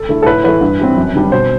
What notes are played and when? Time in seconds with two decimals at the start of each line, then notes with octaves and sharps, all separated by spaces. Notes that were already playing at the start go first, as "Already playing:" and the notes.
Already playing: A4
0.09 D3 A3 E4
0.23 A4
0.26 A2 B4
0.44 E3 A3 B4
0.61 G2
0.79 E3 G3 C4
0.97 F#2
1.15 D3 G3 D4
1.32 B2 C5